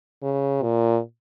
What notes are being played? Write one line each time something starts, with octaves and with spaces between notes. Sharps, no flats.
C#3
A#2